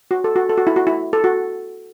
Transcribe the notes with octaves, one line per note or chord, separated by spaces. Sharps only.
F#4
A4
F#4
A4
F#4
E4
F#4
E4
A4
F#4